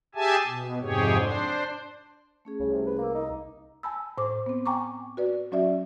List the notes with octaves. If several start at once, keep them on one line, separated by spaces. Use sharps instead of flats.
G4 G#4 E5 G#5 A5
B2
F2 G#2 C3 G4 G#4 C#5
D4 C5
A3 C#4 G#4
C2 C#3
C3
B4
A#3 D6 E6
D#4
G#5 A5 B5 E6
A2 C5 D6
B3 C4
G5 G#5 A#5 C#6 D6
F#4 B4 D5
F#3 C#4 F#4 D5 E5